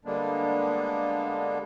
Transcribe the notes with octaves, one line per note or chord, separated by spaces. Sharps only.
D3 G3 G#3 A#3 B3 D4